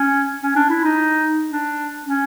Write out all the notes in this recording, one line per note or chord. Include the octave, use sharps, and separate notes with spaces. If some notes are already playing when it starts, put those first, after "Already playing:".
Already playing: C#4
C#4
D4
E4
D#4
D4
C#4